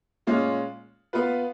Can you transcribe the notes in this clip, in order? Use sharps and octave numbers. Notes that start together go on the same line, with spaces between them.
A#2 G#3 C#4 F4
B3 F4 B4